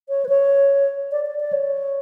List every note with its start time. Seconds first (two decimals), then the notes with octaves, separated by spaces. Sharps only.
0.09 C#5
0.25 B4
0.29 C#5
1.12 D5
1.26 D5
1.40 D5
1.53 C#5